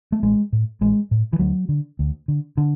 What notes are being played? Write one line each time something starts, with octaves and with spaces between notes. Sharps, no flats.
A3
A1 G#3
A2
A1 G#3
A2
E3
D2 F#3
D3
D2
D3
D3